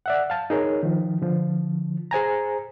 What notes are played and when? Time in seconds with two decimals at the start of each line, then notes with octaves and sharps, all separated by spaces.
0.06 D5 E5 F#5
0.30 F5 A5
0.50 D#4 G#4 A#4 C#5
0.83 D#3 F3
1.22 D3 F3
2.11 G#4 C5 G#5 A#5